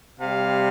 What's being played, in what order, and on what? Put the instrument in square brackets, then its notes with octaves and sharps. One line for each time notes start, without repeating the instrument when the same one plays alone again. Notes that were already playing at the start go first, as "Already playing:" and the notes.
[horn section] C3 G3 F5